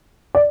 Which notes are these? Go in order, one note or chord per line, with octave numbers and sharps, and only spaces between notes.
D5